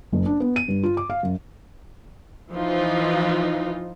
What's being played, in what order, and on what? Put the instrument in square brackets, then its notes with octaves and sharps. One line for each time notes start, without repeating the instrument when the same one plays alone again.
[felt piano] F#1
D4
B3
D#7
G2
F4
D6
F5
F#2
[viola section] E3 F3 D#4 F4